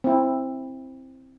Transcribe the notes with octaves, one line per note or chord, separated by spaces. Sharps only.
C4 E4